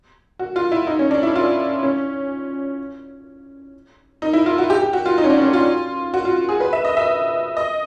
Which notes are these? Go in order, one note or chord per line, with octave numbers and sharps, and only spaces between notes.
F#4
F4
E4
D#4
C#4
D4
E4
F4
C#4
D#4
E4
F4
F#4
G4
G4
F#4
F4
D#4
C#4
D4
C#4
F4
F#4
F4
G#4
B4
E5
D#5
E5
D#5